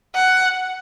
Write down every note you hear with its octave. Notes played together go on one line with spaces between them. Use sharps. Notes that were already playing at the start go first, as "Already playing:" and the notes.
F#5